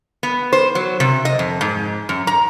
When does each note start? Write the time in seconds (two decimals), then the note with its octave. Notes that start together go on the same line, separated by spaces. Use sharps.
0.23 B3
0.53 C5
0.75 F#3
1.00 C3
1.25 D#5
1.39 F2
1.61 G#2
2.09 F#2
2.27 A#5